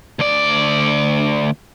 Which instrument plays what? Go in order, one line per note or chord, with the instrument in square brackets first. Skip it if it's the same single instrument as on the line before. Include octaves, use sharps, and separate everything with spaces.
[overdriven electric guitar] D2 D5